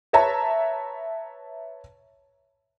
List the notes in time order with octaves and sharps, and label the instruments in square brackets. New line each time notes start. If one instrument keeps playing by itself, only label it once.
[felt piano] B4 C#5 E5 A5 A#5